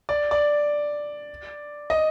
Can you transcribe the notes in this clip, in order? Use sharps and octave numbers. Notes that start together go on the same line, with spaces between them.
D5
D5
D#5